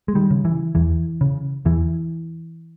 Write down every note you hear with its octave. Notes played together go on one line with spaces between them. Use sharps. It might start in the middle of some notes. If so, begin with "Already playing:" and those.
G#3
D#3 G3
C#3
E3
E2 E3
C#3
E2 E3